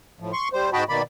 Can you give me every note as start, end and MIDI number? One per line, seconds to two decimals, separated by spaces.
0.20 0.32 45
0.20 0.32 53
0.33 0.48 84
0.33 0.48 85
0.53 0.70 55
0.53 0.70 72
0.73 0.84 44
0.73 0.84 66
0.73 0.84 75
0.73 0.84 79
0.73 0.84 81
0.73 0.84 83
0.89 1.02 47
0.89 1.02 51
0.89 1.02 58
0.89 1.02 74
0.89 1.02 83